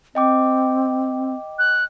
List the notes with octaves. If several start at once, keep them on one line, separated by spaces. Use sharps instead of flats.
C4 D#5 G5 D6
F#6